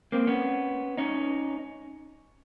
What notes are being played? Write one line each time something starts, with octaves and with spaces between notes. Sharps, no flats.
A#3 C4
B3 C#4
C#4 D#4